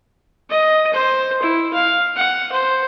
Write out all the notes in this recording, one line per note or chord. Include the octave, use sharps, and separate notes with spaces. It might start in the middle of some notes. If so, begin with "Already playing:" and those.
D#5
C5
E4
F5
F#5
C5